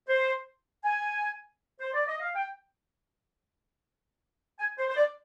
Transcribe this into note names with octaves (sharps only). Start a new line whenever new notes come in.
C5
G#5
C5
D5
D#5
F5
G5
G#5
C5
C5
D5